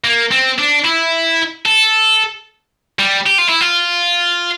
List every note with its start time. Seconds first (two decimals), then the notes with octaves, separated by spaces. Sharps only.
0.04 A#3
0.32 C4
0.59 D4
0.85 E4
1.66 A4
2.99 G3
3.26 G4
3.38 F4
3.49 E4
3.61 F4